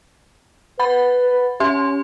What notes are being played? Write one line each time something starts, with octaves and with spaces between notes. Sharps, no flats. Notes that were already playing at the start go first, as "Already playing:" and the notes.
B4 F#5 B5 A6
C#4 G4 E5 C6